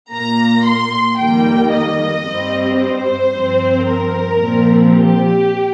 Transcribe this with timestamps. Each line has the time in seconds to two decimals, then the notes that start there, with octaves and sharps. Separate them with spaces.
0.12 A#2 A#3 A#5
0.66 C6
1.19 F2 D#3 G3 A#3 G5
1.73 D#5
2.25 G2 G3 C4
2.79 C5
3.32 G2 F3 C4
3.85 A#4
4.38 A#2 F3 C4
4.91 G4